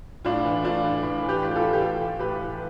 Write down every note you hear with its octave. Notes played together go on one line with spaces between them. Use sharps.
A2 D4 F4
E3
A2 D4 F4
E3
A2
E3
G4 B4
A2
G4
F4 A4
E3
G4
A2 F4 A4
E3
A2 G4 B4
E3